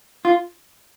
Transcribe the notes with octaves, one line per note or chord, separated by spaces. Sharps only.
F4